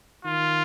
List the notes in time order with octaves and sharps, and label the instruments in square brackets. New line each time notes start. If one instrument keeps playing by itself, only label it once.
[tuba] D#3 [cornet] F4